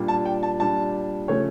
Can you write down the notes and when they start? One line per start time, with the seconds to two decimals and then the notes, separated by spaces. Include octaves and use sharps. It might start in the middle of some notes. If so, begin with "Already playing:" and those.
Already playing: A#2 G3 D4
0.08 A5
0.25 G5
0.43 A5
0.59 A#2 G3 D4 A5
1.28 C#3 F3 A3 C#5